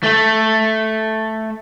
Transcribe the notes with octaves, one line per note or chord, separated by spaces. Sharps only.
A3 A4